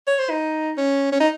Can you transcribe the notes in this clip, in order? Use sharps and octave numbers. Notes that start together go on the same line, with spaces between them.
C#5
C5
D#4
C#4
C#4
D#4